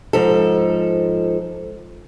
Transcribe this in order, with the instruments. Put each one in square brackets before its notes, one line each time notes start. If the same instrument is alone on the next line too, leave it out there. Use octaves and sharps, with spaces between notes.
[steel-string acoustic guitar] G#2 F3 A4